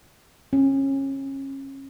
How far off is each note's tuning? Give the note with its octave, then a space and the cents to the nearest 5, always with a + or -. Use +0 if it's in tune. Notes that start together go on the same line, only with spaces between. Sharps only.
C#4 -30